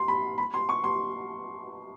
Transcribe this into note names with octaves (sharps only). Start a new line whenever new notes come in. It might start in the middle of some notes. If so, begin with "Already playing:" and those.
Already playing: C6
B5
B5
C6
C#6
C6